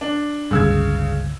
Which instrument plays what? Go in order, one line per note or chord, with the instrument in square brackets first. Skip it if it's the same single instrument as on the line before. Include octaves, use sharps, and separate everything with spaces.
[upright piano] D4
[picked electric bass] G1 C#2 G2 [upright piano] C#3 E6 G#6